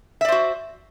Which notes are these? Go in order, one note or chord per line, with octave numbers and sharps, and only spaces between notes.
F#4 C5 D5 E5